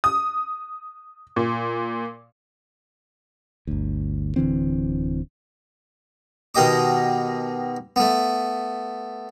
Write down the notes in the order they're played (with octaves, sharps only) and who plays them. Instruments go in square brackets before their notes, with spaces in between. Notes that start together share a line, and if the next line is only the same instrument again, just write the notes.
[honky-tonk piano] D#6
A#2
[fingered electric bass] G1 D2
D1 D3 E3 C4
[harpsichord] B2 D#3 G4 D#5 D6
A3 B3